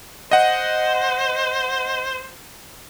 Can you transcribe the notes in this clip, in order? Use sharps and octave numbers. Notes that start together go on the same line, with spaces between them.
C5 D#5 F#5